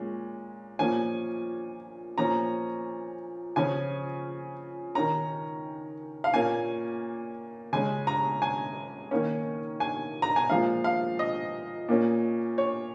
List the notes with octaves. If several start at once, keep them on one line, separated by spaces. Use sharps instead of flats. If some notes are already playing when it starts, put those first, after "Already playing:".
Already playing: A#2 G#3 C#4
A#2 F3 A#3 C#4 G#5
A#2 F3 C#4 A#5
C#3 F3 C#4 G#5
D#3 C#4 A#5
F5
A#2 A#3 C#4 G#5
C#3 G#3 C#4 G#5
A#5
G#5
D#3 A#3 C#4
G#5
A#5
G#5
A#2 F3 G#3 F5
F5
D#5
A#2 A#3 C#4
C#5